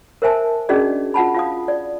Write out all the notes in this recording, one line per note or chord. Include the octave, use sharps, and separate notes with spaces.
A#4 C5 E5 G#5 A5
C#4 D4 F#4 G#4 D5 D#5
F4 F#5 A5 B5
F4 F5 D#6
D5